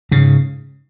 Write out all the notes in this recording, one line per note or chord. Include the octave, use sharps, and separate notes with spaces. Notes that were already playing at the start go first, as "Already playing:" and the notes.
G#2 C#3